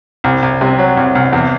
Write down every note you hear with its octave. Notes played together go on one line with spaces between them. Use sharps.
C2
C2
C3
F#3
C2
C2
E2